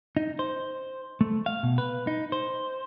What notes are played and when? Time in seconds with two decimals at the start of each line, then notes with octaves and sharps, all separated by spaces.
0.17 D#4
0.39 C5
1.21 A3
1.46 F5
1.63 B2
1.78 B4
2.07 D#4
2.32 C5